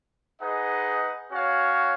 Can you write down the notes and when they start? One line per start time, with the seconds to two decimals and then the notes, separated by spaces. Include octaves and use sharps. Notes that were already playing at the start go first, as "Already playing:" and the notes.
0.41 D#4 G#4 B4 D#5 F#5
1.30 C#4 F#4 C#5 F5